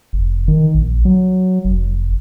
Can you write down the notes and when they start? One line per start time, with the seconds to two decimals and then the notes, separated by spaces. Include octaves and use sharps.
0.13 F1
0.48 D#3
0.74 A#1
1.05 F#3
1.65 F1